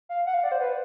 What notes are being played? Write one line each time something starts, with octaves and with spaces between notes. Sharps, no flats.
F5
F#5
F5
D5
C5
B4